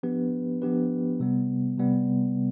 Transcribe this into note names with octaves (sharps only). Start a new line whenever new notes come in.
F3 B3 D4 G4 B4
F3 B3 D4 G4 B4
C3 G3 B3
C3 G3 B3